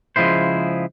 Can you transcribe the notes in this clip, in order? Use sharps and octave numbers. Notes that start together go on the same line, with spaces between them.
C#3 F3 G#3 E4 C5